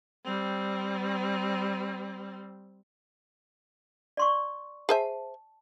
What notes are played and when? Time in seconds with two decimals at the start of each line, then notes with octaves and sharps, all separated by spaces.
0.25 G3 C4
4.17 D5 C6 C#6
4.89 G#4 C5 E5 A5